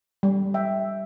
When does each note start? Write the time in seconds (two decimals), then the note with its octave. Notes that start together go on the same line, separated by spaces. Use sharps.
0.23 G3
0.54 E5 G5